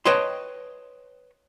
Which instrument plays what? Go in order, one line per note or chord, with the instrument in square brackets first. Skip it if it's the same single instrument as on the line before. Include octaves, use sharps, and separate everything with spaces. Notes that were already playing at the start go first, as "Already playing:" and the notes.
[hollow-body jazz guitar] B4 C#5 D#5 G5 A5 C6